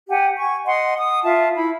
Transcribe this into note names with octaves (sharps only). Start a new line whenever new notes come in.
G4 F#5 G#5
G#5 C#6
D#5 F#5 C6
D#6
F4 E5 A5
E4 B5